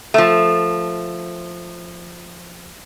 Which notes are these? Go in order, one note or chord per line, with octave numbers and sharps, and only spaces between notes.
F3 A3